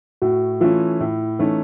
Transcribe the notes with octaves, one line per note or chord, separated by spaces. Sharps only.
A2 F#4
E3 A3 C#4 F4
A2 E4
E3 A3 C#4 D#4